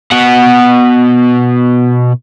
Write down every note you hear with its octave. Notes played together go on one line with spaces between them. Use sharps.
B2 F#5